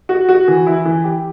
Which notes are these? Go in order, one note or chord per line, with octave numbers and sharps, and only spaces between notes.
F#4
F#4
E3
E4
E3
G4